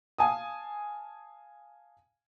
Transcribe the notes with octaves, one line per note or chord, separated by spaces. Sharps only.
F5 G#5 A5 D#6